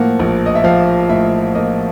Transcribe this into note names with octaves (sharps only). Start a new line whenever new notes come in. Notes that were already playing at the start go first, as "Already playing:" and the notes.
Already playing: A2 F3 A#3 F#5
A#1
D#5
E5
F3 F5
A2 E5
A#3 D#5